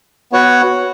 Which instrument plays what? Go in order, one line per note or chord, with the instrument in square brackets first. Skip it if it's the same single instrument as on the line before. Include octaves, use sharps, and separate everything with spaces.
[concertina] B3 F#4 C#5 F#5